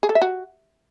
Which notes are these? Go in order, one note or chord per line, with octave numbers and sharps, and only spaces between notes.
G#4
A4
E5
F#4